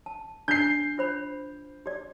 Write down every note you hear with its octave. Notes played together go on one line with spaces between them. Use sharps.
A5
D4 G6 C7
F4 C5 B5
G4 D5